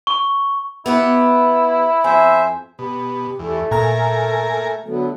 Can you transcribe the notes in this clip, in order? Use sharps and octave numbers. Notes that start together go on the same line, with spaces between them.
C#6
B3 E4 G4 B4
F2 C5 E5 G#5
B2 G4
E2 A3
A#2 A4 A#4 G#5 A#5 F6
D3 F#3 A3 B3